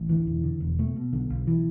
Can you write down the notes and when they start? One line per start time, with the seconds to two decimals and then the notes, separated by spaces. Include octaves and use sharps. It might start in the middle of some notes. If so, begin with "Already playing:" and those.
Already playing: A1
0.09 D2 E3
0.27 E1
0.43 D3
0.60 E1
0.79 B2 A3
0.96 B2
1.13 B1 D3
1.30 B1
1.47 E3